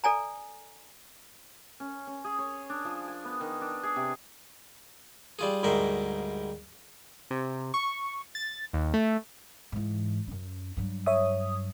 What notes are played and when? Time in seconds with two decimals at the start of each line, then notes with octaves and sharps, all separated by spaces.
0.04 A4 D5 G#5 A#5
1.80 C#4
2.07 C#4
2.25 G#4
2.39 C#5
2.70 D4
2.85 F3
3.08 G#5
3.25 B3
3.41 D#3
3.61 D4
3.83 G#4
3.96 C3
5.39 G3 F4 G#4
5.63 D2 G#2 G3 A#4 E5 C6
7.31 C3
7.74 C#6
8.35 A6
8.73 D#2
8.94 A3
9.72 G#2 E3
10.27 F#2 C#4
10.77 G2 F#3
11.06 C#5 E5 D#6